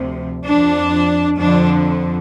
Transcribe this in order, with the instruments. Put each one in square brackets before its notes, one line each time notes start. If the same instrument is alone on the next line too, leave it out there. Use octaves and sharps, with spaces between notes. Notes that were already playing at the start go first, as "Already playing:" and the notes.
Already playing: [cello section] D2 C3 F3
F2 F3 D4
F2 D3 F3 D4